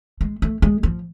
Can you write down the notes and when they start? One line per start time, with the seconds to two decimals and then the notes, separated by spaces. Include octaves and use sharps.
0.21 G#3
0.42 A3
0.62 G#3
0.83 F3